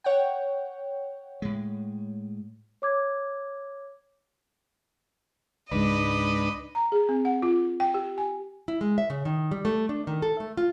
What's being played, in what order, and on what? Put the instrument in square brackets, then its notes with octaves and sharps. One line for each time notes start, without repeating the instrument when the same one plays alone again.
[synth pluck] C#5 F#5 G5
[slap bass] A2 G#3
[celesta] C#5 D6 G#6
[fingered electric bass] C#2 G#2 [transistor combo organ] D4 B4 [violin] D#5
[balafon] A#5
G#4
C4
F#5
F4
G5
G4
G#5
[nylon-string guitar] E4
G#3
E5
C#3
D#3
G3
A3
D4
D#3
A4
A3
F4